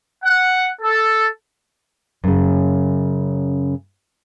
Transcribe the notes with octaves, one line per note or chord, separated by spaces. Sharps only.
F#5
A4
F#2 C#3